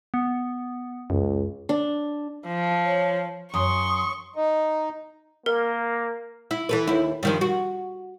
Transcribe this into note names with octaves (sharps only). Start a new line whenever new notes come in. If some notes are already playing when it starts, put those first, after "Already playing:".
B3
C#2 F#2
D4
F3
C#5
F#2 C6 C#6 D#6
D#4
A#3 A#4
E4
E3 A4 B4
D#2 E4
G2 D#3 F3
F#4